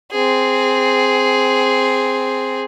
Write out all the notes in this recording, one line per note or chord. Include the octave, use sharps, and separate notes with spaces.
C4 G#4